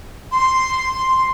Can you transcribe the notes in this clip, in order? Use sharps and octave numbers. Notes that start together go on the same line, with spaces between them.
C6